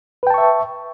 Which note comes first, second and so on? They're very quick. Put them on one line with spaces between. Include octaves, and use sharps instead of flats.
B4 G5 A5 C#6 E5